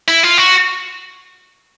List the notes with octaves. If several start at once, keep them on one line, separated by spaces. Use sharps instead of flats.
E4
F4
F#4